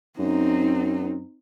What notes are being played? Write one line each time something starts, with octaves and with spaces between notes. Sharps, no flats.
F#2 C4 D#4